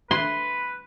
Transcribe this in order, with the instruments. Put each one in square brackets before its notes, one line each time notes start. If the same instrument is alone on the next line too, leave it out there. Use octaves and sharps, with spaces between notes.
[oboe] B4 [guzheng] C6